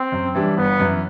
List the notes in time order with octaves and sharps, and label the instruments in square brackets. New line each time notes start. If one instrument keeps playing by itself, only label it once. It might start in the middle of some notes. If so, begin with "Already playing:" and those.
Already playing: [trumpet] C4
[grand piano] F#2
E3 G3 D4
[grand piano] G1 [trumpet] B3
[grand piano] F#2 E3